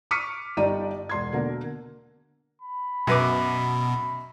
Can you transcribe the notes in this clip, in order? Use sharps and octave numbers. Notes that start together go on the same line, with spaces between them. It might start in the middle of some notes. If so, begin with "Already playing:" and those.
C#6 D6 F6 B6 C#7 D#7
G1 D#4 G4 D5 D#7
E1 C6 G#6
B2 D3 A#3 A#4
B5
F#2 B2 B4 D6